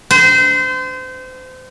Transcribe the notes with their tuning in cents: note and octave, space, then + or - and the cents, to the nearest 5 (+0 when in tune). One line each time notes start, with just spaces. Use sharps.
C5 -30